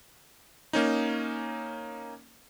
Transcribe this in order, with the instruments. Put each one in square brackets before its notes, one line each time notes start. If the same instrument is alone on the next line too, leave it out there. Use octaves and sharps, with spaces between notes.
[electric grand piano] A#3 C#4 D#4